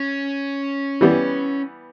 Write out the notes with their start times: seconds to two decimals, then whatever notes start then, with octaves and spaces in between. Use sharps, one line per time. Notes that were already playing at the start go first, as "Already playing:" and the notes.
Already playing: C#4
1.01 E3 G3 B3